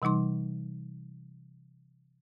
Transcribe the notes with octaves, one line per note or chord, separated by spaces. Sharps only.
C3 E3 G3 D#4 C6